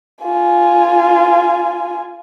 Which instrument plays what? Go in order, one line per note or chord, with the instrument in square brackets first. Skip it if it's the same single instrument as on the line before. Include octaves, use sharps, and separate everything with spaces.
[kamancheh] F4 G#5